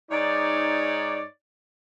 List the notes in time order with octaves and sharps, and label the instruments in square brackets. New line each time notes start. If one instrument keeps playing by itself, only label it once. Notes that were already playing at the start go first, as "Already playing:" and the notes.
[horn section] G#2 D#4 C#5 D5